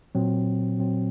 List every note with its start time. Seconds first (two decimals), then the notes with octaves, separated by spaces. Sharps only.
0.15 A#2 F#3 C4
0.79 A#2 F#3 C4